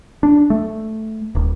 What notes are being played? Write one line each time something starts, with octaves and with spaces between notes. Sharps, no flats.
D4
A3
D1